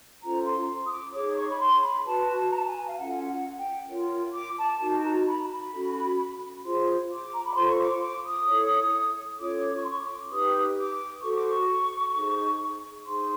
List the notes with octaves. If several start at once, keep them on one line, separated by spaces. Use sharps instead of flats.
C#4 F4 A4 C5 A#5
C6
D#6
D6
D#4 G#4 C#5 D6
D6
C#6
B5
C6
B5
F#4 B4 A5
A5
A#5
A5
G#5
F5
C#4 F4 A4 F#5
F#5
G5
F4 A#4 C#5
D6
A5
D#4 F#4 A#4 A5
A#5
B5
B5
C#4 F#4 A4
F4 G#4 C5 C6
D6
A#5
B5
F4 A4 C5 C6
C#6
D6
D6
D#6
E4 A4 C#5
C#4 F4 A4 C#5 D6
D6
C#6
C6
C#6
D6
D#4 G4 B4 D#6
D6
F#4 A4 C5 C#6
D6
C#6
D#4 G#4 C5
D#4 G#4 C5 C6